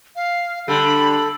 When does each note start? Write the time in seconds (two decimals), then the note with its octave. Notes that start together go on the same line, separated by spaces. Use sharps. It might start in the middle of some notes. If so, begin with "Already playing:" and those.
0.16 F5
0.68 D3 G3 A4 B5